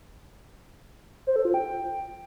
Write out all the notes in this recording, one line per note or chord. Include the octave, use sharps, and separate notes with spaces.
C5
A4
F4
G5